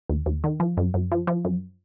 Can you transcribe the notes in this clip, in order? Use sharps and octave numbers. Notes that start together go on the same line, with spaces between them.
D#2
D#2
D#3
F3
F#2
F#2
F3
F3
F#2